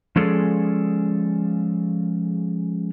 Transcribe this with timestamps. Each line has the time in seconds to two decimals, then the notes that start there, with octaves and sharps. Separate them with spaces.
0.16 F3 G#3 C#4 G#4 A4 D5